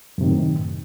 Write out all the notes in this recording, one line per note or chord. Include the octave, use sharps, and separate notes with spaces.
F#2 A2 C3 D#3